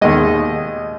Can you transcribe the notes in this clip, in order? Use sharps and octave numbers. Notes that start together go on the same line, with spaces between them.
D#2 D#3 G#3 D#5